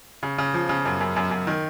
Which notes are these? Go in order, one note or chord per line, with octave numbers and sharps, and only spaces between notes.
C#3
C#3
F3
C#3
F#2
F#2
F#2
F#2
D#3